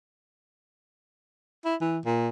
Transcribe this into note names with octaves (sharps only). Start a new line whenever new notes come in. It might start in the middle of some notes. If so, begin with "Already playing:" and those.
E4
E3
A#2